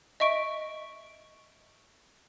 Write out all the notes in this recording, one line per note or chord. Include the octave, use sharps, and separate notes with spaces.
D#5 E5 C#6 D7